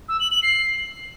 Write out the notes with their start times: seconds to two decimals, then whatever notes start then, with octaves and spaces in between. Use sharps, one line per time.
0.09 E6
0.20 F#7
0.31 F#7
0.43 C7